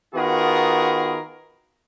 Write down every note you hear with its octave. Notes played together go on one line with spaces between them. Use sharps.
D#3 B3 F4 F#4 G#4 A#4